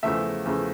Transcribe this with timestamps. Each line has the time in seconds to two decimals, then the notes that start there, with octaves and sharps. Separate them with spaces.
0.03 E2 C#3 F3 A3 E5
0.45 E2 C#3 F3 A3